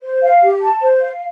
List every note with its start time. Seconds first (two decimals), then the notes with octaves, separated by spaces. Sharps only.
0.02 C5
0.22 F5
0.42 G4
0.61 A5
0.81 C5
1.00 F5